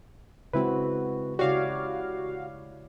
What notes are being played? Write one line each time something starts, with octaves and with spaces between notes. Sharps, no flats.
C#3 G#3 C4 E4 F#4 B4
C#3 E4 F#4 G4 C#5 D5 F5